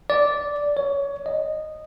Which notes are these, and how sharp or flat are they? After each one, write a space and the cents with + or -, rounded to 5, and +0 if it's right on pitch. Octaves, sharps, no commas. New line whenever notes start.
D5 -10
C#5 +20
D#5 -10